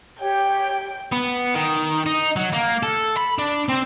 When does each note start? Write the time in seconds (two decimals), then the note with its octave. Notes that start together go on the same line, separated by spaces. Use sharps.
0.20 G4 C#5 G5
1.12 B3
1.55 D#3
2.06 D#4
2.36 F#3
2.53 A#3
2.83 A4
3.17 B5
3.39 D4
3.69 C4